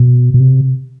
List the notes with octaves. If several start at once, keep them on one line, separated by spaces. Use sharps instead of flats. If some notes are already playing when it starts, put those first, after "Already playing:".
Already playing: B2
B2
C3